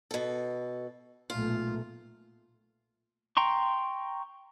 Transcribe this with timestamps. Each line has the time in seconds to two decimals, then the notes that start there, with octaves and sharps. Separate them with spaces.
0.11 B2 A4
1.30 B1 A#2 A3 F4
3.37 G5 A#5 C6 C#6